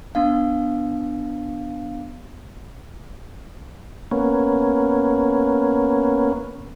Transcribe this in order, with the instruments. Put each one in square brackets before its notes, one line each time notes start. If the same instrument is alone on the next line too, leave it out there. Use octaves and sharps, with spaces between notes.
[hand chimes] B3 D4 F5
[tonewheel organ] A#3 B3 C#4